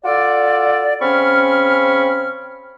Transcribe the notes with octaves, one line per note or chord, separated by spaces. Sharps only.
F4 F#4 A4 D5
C#3 C4 C#4 B5 C#6 F6